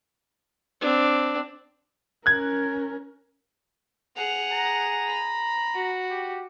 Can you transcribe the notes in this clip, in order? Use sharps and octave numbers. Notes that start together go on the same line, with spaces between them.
C4 D4
C#4 A#4 F#6 G#6
G#4 F#5 F7
A#5
B5
F#4
G4